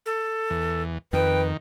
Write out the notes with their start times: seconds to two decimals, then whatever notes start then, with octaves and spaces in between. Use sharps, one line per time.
0.06 A4
0.50 E2
1.13 F2 D#3 B4 G5